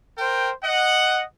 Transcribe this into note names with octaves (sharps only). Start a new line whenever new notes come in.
A#4 C5 G5
D#5 F#5